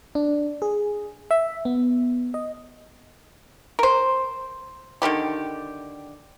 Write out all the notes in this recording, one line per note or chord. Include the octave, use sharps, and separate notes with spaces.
D4
G#4
E5
B3
D#5
A#4 C5
D3 D#3 G3 G4